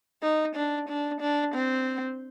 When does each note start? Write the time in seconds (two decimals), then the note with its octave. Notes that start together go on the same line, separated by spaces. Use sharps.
0.22 D#4
0.55 D4
0.88 D4
1.20 D4
1.54 C4